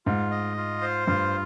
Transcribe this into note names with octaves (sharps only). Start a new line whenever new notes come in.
G#2 F4
D#5
F4
C5
G2 F4